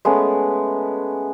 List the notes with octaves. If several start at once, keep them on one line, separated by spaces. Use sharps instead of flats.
G#3 A3 B3 C#4